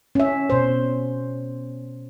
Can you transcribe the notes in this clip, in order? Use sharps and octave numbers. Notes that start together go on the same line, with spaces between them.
C#4 E5
B2 C5